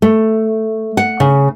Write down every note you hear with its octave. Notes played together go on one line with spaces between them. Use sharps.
A3
F#5
C#3